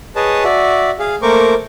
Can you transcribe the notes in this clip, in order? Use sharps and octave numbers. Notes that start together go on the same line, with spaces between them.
G#4 B4 C#5 D#5 A5
F#4 D5 E5
G#4 F5
A3 A#3 A#4 C5 C#6 D6